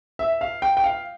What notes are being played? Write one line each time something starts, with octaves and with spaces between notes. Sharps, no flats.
E5
F5
G5
G5
F5